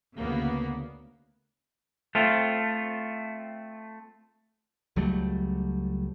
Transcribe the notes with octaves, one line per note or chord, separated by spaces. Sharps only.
D2 C#3 A#3 B3
A3 C4 F4
C#2 F#3 G3 A3